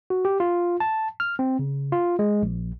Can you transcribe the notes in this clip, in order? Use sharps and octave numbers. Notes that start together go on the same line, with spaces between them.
F#4
G4
F4
A5
F6
C4
C#3
F4
G#3
A#1